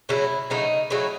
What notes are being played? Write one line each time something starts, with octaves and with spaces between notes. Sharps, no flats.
C#3 F#3 A3 E4
C#3 F#3 A3 D#4
C#3 F#3 A3 E4